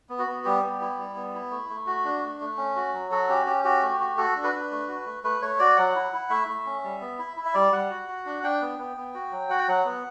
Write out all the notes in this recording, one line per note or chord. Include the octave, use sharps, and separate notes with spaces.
B3
F#4
B3
G3 G4
B3
E4
G3
B3
E4
A3
A3
F#4
D4
A3
A3
C#4
F#4
F#3
F#4 A4
C#4 G4
C#4 G4
F#4 G4
A3
F#4
F#4 A4
D4
B4
D4
A3
F#4
A3
A3 B4
A3 C#5
F#4 D5
F#3 F#5
E4
E4
A3 E5
A3
C#4
G3
B3
E4
E4
E5
G3 D5
G3 F#5
F#4
F#4
D4
D4 G5
B3
B3
B3
F#4
F#3
F#4 F#5
G5
F#3 F#5
B3